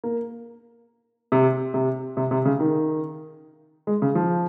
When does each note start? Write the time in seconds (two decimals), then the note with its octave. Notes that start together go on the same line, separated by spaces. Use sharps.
0.04 A#3
1.32 C3
1.74 C3
2.17 C3
2.31 C3
2.45 C#3
2.60 D#3
3.87 G#3
4.02 C#3
4.15 F3